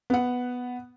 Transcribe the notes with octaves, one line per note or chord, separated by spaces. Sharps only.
B3 F#5